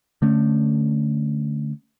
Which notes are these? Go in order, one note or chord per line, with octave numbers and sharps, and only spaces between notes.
D3 A3 C#4